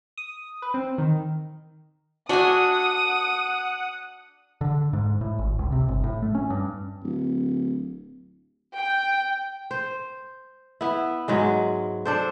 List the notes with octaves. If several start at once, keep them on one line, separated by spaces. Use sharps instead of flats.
D#6
B4
C4
D#3
A3 D4 F#4 E5 F#5 G#5 D#6
D3
G#2
A2
G#1
C#2
C3
G1
A2
A3
C#4
G2
D1
G5
C5
B3 E4
G#2 F#3 G#3
D4 A4 C5